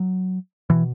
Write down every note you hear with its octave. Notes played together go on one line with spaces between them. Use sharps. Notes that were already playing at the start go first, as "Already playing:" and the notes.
Already playing: F#3
B2 E3